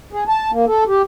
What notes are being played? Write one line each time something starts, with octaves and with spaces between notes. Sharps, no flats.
G#4
A5
A#3
A4
G4